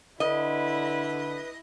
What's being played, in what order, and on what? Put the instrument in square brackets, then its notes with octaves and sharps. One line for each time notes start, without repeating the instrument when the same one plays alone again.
[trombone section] D3 [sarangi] E4 [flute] B4 [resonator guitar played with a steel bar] D#5